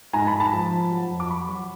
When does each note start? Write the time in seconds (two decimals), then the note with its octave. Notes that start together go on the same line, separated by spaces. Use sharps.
0.13 G#2 G#5 A#5
0.27 A5 B5
0.33 G#2
0.40 A5 B5
0.53 F3
0.71 F3
0.91 F#3
1.10 F2
1.20 D6
1.30 F#3 B5 C#6
1.49 F#3